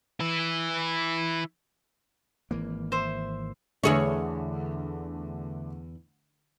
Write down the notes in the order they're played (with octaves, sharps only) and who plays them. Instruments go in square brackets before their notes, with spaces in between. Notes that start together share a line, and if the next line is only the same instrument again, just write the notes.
[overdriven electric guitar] E3 E4
[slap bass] G#1 E3 A#3
[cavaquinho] C5 E5
[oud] E2 G#4 C#5 [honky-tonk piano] D3 A3 D4